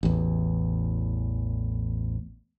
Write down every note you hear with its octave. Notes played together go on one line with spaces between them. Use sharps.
A1 E2